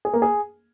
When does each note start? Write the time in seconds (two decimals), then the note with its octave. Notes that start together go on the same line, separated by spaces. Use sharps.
0.05 G#4
0.13 A#3
0.22 G#4